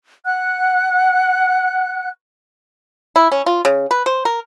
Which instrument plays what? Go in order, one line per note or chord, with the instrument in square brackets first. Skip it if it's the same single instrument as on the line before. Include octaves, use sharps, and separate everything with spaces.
[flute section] F#5 F#6
[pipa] E4
C#4
F4
C#3
B4
C5
A#4